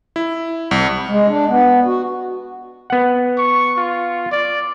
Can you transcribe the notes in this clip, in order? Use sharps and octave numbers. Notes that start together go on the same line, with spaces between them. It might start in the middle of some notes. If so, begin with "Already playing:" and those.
E4
C2
G#3
D4
B3
F#4
B3 F#5
C#6
F4
D5